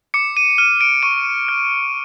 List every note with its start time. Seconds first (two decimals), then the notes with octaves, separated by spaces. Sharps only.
0.14 D6 C#7
0.37 D#7
0.58 F6 D#7
0.81 D7
1.03 C#6 D#7
1.48 F6